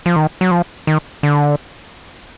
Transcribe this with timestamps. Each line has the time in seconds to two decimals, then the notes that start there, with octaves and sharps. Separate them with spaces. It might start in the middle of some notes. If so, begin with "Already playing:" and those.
0.06 F3
0.16 D#3
0.41 F#3
0.51 F3
0.87 D#3
1.23 D3